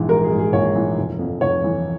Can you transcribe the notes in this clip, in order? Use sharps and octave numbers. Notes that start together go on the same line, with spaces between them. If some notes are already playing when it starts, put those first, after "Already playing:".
Already playing: A#1 G#2 E3
G#3 A#4
G#4
G#2
G#4
A#1 C#5
E3
F1
F2
F1 C#5
E3